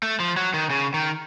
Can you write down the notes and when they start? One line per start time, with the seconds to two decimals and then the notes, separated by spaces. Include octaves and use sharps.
0.03 A3
0.20 F3
0.37 F#3
0.54 D#3
0.70 C#3
0.94 D#3